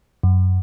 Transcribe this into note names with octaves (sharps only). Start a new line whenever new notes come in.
F#2